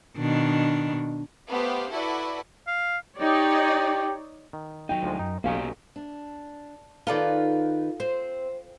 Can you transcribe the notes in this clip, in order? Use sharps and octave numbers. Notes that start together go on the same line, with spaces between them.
B2 D#3 D4
A3 B3 G4 C5 F5
E4 F#4 A4 B4 D5 F#5
F5
D#4 G4 C#5 D5
D#3
F#3 D#4 G5
D2 F3 G#3
F#2 D#4
B1 A#3 C#4 D#4 G4 A4 F5
D4
D#3 D#4 F4 A4 B4 D5
C4 C5